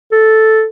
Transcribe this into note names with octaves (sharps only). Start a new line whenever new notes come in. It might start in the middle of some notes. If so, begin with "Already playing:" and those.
A4